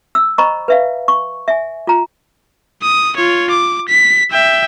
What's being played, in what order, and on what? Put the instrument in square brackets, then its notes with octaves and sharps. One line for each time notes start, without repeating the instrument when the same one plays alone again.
[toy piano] E6
C5 D#5 A#5 B5 C#6
B4 E5 F5
C#6
E5 G#5
F4 A#5
[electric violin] D#6
F4 C#5
D6
B6
E5 G5